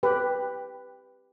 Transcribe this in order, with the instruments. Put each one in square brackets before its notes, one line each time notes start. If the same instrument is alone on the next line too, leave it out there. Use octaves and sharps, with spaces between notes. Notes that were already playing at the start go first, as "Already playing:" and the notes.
[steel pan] G4 B4